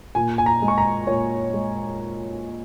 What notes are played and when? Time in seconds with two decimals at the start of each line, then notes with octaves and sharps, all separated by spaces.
0.15 A#2 G#5
0.38 G#5
0.46 A#5
0.62 G#3
0.68 C#6
0.78 A#5
1.07 A#2 C#5
1.54 G#3